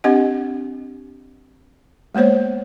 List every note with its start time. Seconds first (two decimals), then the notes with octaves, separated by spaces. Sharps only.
0.04 C4 D4 G4 D#5 F#5
2.15 G#3 A#3 B3 C5 C#5